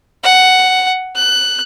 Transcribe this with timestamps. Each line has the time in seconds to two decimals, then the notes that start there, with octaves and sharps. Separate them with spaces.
0.24 F#5
1.16 F#6